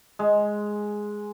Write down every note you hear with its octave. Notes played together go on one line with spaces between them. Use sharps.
G#3